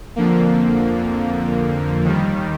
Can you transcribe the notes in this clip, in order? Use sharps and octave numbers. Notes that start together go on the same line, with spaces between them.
F2 D3 F3 A#3
D#2 D#3 G3